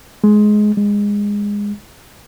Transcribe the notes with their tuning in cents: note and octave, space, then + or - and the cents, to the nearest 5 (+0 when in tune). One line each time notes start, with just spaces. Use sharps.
G#3 +15
G#3 -20